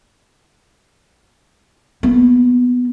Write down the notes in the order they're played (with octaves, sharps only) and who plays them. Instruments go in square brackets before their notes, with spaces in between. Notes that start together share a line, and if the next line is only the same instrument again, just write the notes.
[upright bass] A#3 B3